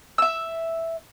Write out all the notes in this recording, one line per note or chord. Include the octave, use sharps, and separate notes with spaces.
E5 E6